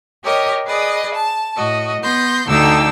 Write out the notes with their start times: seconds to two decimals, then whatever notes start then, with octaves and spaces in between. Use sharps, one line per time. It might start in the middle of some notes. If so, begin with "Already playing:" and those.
0.22 G4 A#4 C#5 D#5
0.65 G#4 B4 D5 D#5
1.14 A5
1.56 A2 F#4 D#5
2.01 B3 C6 G6 A#6
2.46 D2 D3 D#4 G5 E6 A6